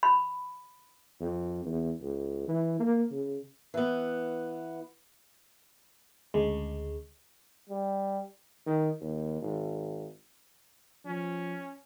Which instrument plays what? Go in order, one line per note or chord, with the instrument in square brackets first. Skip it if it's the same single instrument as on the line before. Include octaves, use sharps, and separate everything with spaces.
[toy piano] B5
[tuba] F2
E2
C#2
E3
A#3
C#3
[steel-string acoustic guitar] E3 B3
[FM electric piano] D2 C#3 G#3
[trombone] G3
[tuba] D#3
D#2
G#1
[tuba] F3 [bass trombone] C#4